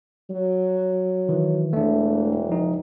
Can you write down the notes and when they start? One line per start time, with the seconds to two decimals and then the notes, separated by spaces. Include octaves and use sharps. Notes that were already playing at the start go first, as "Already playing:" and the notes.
0.30 F#3
1.29 D#3 E3
1.73 E1 A3 D4
2.49 F3 D#4